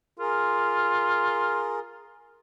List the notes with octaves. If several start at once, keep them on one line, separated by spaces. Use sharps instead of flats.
F4 G#4 A#4